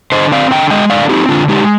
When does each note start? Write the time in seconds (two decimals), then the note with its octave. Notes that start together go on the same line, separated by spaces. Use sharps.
0.12 D3 C5 D#5
0.32 C4 D5 F5
0.51 D3 D#5 G5
0.70 G#3 D#5 G5
0.90 D3 D5 F5
1.09 C4 D#4 G4
1.29 D3 D4 F4
1.48 G#3 D#4 G4